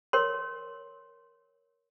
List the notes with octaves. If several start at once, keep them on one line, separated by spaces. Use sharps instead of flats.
A#4 C#5 C6